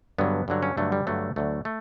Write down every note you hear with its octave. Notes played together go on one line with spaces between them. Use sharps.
G2 D3 F#3 B3
G2 D3 F#3
C#4
G2 D3 F#3 A3
G3
G2 D3 F#3 A3
D2 D3 F#3 A3
A3